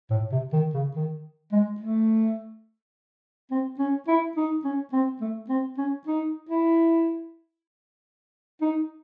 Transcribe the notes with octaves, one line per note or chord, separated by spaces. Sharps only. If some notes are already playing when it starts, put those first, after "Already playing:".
A2
C3
D#3
C#3
D#3
G#3
A3
C4
C#4
E4
D#4
C#4
C4
A3
C4
C#4
D#4
E4
D#4